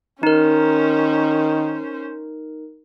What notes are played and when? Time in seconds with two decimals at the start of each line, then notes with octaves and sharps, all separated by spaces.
0.23 D#3 C#4 D#4 A#4 C5